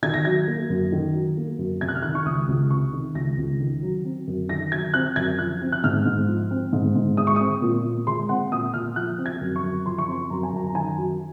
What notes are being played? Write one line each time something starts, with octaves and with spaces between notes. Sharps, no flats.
D#3 G#6
A#6
F#3 G#6
A#3
F#2
D#3
F#3
A#3
F#2
C3 G#6
F#6
F6
D#3 F#6
C#6
C#2 D#6
C#2
C3 C#6
D#3
C#2 A#6
C#2
D#3
F#3
C4
F#2
D#3 A#6
F#3 G#6
C4 F#6
F#2 G#6
F3 F#6
C4
F#6
G#2 F6
G#2
F3
C4
G#2
G#2
G#3 D#6
C#6
C4 D#6
A#2
A#2
G#3 C6
C4 F#5
A#2 D#6
A#2 F6
F3 F#6
C4
G#6
F#2
C#6
F#2
F3 C6
C#6
C4 C6
F#2 A#5
G#5
F#2 A#5
A#5
D#3 G#5
F#3